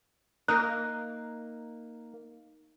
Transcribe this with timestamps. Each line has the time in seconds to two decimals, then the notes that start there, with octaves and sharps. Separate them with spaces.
0.48 A#3 D#4 A#4 F#6